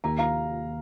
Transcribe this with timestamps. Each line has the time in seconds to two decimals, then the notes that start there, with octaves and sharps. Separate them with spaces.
0.04 D#2 D#3 A#3 G4 A#5
0.19 F5 A#5